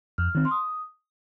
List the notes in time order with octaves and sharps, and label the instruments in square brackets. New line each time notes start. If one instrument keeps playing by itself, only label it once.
[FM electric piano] F2 [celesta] F6
[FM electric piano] D#3 C4
[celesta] C6
D#6